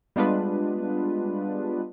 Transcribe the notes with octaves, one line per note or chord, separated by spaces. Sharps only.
G3 G#3 B3 D4 F4 B4